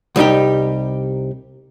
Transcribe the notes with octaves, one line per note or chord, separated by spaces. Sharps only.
C2 G3 D#4 G4